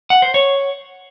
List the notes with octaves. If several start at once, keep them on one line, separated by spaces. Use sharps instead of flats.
F#5
C5
C#5